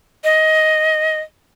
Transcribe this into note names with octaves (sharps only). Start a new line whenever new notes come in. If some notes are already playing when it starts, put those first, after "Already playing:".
D#5